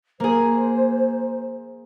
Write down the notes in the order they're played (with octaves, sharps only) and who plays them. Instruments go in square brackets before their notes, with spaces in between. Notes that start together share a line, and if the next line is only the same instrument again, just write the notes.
[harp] A#3 G#4 [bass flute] C5